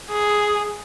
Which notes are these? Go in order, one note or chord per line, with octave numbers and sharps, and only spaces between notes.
G#4